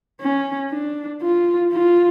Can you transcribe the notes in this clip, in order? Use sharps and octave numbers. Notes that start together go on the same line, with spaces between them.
C#4
D4
F4
F4